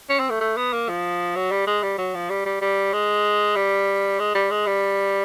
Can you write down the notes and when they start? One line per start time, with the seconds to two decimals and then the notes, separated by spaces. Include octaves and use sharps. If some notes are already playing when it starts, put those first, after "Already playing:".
0.09 C#4
0.19 C4
0.30 A3
0.41 A3
0.57 B3
0.73 A#3
0.88 F3
1.36 F#3
1.51 G3
1.67 G#3
1.83 G3
1.98 F#3
2.15 F3
2.30 G3
2.46 G3
2.61 G3
2.93 G#3
3.56 G3
4.19 G#3
4.35 G3
4.51 G#3
4.67 G3